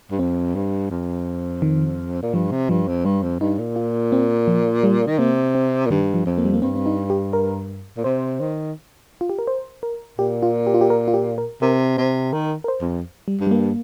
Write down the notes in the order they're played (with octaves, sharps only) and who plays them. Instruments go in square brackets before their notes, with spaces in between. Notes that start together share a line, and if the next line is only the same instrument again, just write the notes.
[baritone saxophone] G2
[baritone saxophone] F2 [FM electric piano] C4
[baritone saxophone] G2
F2
[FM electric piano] D#3
[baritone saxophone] A#2
[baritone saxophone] G2 [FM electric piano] F3
[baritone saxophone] C3
[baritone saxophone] G2 [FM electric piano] F3
[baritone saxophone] F2
[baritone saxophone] G2 [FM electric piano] G3
[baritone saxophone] F2
[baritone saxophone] G2 [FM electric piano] D#4
[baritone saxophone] A#2
[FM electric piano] F4
C4
F3
G3
[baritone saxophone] D#3
[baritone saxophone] C3 [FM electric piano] A#3
[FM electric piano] C4
[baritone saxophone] A#2
[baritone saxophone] G2 [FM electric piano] D#3
[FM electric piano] F3
[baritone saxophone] F2
[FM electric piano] A#3
G3
A#3
[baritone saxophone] G2 [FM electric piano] C4
[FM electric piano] C4
D#4
G4
A#4
[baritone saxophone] A#2
[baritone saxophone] C3 [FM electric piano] C5
[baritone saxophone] D#3
[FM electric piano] F4
G4
A#4
C5
A#4
[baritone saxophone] A#2 [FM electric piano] G4
[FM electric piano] F4
G4
F4
G4
A#4
F4
G4
A#4
[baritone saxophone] C3 [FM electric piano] A#4
[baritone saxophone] C3 [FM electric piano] C5
[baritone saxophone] D#3 [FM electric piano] A#4
[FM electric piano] A#4
C5
[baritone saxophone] F2
[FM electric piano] G3
[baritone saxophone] G2
[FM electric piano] G3
A#3